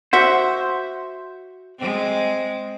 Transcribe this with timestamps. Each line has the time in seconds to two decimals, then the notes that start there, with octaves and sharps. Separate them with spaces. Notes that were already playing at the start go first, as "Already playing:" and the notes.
0.13 F#4 C5 E5 F#5
1.79 G#3 C4